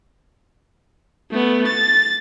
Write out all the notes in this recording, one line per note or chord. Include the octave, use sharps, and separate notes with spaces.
A3 B3
A6